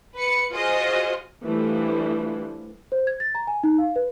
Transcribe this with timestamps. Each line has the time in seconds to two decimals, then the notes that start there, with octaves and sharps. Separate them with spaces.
0.16 B4 C#7
0.53 F4 F#4 G#4 C5 D#5
1.43 E3 F3 G3 A3 D4 E4
2.92 C5
3.07 G#6
3.20 A6
3.35 A#5
3.47 G#5
3.64 D#4
3.78 F5
3.96 B4